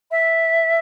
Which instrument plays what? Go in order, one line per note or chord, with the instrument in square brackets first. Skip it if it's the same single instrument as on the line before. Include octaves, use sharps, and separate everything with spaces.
[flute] E5